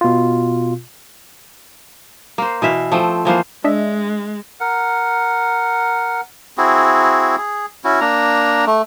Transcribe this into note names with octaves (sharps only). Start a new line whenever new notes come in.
B2 F4
A#3 C5
B2 E3 E5 F5
F3 A3 C4
E3 F3 A#3 C5
G#3 D4 D#5 E5
A#4 F#5
C4 E4 F#4 G#4
G#4
C#4 E4 F#4
A#3 D4 A#5
A3